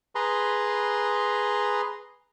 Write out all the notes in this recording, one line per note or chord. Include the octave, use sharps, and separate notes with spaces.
G#4 B4 A#5 C6